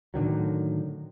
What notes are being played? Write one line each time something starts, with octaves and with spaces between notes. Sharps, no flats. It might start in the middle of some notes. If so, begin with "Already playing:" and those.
A2 D3 D#3 F#3